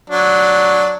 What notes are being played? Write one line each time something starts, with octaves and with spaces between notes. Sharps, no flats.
F#3 D4